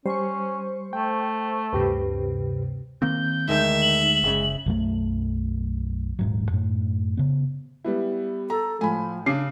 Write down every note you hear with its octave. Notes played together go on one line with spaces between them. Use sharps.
G3 C#4 C5 C#6
A3 G5
D2 G2 C3 G4 B4
D#3 A#3 C4 G6
D2 D3 D#3 G#3 E5
F#7
F#1 A2 C#3 G#3
B1 F#2 F#3 A3
D#1 G#2 F#3
F#2 A2
C#3 B3
G3 B3 E4
A4 A#5
A2 F3 G#5 B5
C#3 D4 D6 C7